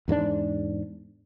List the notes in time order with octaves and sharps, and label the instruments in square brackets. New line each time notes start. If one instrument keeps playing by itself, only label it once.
[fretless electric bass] E2 G#2 G#3 D4